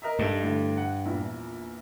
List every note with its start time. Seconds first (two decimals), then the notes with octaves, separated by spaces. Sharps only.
0.02 A#4 D#5 E5
0.19 G2 D#4 A4 E5
0.42 A2 D3
0.77 F#5
1.05 A#1 E2 E4